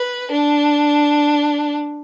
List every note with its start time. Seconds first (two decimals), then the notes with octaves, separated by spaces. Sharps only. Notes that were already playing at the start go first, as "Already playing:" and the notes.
Already playing: B4
0.32 D4